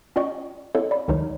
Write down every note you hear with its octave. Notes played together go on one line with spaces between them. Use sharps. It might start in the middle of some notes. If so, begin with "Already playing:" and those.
C#4 F4 D5 D#5 G5 C#6
C4 E4 A4 C#5 D#5 F5
D5 B5
C#2 D#3 F#3 D#4 A#4 C#5